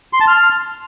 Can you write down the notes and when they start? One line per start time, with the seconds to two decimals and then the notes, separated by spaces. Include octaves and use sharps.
0.13 C6
0.20 A5
0.28 F6